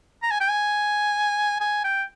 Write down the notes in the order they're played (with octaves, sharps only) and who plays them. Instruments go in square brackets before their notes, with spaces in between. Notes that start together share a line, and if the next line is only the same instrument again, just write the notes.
[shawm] A#5
G#5
G5
G#5
G#5
G5